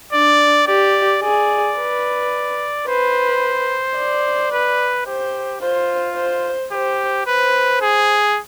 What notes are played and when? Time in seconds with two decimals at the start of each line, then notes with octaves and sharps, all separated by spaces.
0.13 D4 D5
0.67 G4 D5
1.23 G#4 D5
1.78 B4
2.87 B4 C5
3.98 D5
4.52 B4
5.06 G4 C5
5.61 F4 C5
6.16 C5
6.72 G4 C5
7.27 B4 C5
7.81 G#4